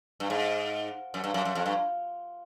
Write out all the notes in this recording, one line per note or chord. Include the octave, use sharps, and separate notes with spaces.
G2
G#2
F#2
G2
F#2
F#2
F2
G2